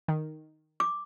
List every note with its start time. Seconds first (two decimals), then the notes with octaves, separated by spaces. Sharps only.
0.08 D#3
0.80 D6